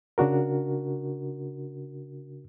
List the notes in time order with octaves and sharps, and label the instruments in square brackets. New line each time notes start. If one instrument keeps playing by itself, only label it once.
[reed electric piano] C#3 D4 F#4 A#4